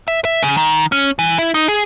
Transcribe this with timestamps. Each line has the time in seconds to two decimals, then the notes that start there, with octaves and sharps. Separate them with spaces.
0.08 E5
0.25 E5
0.43 C#3
0.57 D#3
0.92 C#4
1.19 E3
1.38 E4
1.54 D#4
1.68 G#4